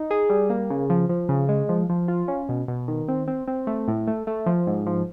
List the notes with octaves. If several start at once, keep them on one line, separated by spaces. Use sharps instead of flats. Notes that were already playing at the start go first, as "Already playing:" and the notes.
Already playing: D#4
G#4
G3
A#3
C#3
F3
F3
C#3
G#3
F3
F3
F4
C#4
B2
B2
D#3
C4
C4
C4
A3
A2
A3
A3
F3
G#2
F3